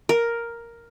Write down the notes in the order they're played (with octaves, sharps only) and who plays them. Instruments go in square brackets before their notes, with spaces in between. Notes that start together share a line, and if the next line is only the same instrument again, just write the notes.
[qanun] A#4